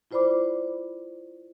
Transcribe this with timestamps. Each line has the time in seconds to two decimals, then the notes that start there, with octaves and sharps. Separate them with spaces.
0.11 E4 F4 C5 D5 B5 D6